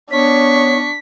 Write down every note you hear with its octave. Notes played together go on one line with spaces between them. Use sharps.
B3 D4 C#5 C#6 B6